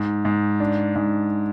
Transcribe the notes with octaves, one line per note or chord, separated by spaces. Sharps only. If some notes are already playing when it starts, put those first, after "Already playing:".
Already playing: G#2
G#2
D4
G#2